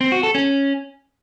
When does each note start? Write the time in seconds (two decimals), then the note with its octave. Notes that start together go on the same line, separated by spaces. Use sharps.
0.01 C4
0.12 F#4
0.23 A4
0.35 C#4